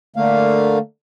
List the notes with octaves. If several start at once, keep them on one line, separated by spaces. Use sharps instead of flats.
D3 A3 A#3 F5